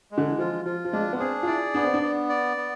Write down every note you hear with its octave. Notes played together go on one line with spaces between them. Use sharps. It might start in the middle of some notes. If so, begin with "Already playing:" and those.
G#3
D3
E3
F3 F4
F3 F4
F3
G#3 D4
B3
C4 G#4
F4
E4 D5
B3 D4
C4
D4
B3
D5
B3